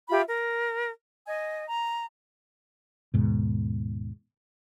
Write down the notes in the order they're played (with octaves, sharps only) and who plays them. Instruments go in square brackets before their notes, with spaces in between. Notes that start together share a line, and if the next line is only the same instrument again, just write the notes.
[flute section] F4 G4 E5 B5
A#4
D#5 G#5
A#5
[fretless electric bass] D#2 G#2 B2